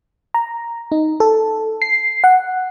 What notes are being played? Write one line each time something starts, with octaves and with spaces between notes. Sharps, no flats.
A#5
D#4
A4
C7
F#5